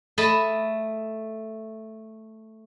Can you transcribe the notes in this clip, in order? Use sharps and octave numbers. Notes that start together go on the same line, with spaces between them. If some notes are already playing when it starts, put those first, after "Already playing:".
A3 D#5 A5 B5